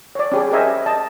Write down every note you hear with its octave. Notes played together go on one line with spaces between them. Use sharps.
C#5 D5
C#4 G4 G#4
G4 A#4 C5 D#5 E5 G#5
D#5 A5